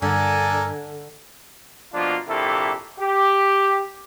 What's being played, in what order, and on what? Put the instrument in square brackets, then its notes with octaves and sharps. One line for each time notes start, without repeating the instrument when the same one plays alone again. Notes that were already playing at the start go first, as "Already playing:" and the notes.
[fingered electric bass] G2 [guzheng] D3 [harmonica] D4 A4 A#4 [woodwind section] G#5
[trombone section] B2 F3 A#3 D4 F4
A#1 C3 A#3 E4 G4 A4
G4